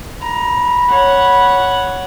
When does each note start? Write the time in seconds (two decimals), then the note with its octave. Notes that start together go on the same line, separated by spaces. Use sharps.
0.22 A#5 B5
0.91 C#5 F#5